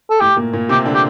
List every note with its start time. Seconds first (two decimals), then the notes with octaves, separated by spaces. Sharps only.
0.10 A4
0.20 A2 A3 G4
0.37 A#2 A#3
0.53 A#2 A#3
0.69 C3 C4 G4
0.86 D3 D4
0.94 G4